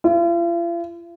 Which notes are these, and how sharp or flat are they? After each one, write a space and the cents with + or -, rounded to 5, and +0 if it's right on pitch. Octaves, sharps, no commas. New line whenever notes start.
F4 -45